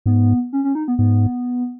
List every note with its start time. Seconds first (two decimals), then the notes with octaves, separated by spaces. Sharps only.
0.06 G#2 B3
0.53 C#4
0.64 C#4
0.75 D#4
0.88 B3
0.98 G#2 B3